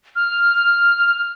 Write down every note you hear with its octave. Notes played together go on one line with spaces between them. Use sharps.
F6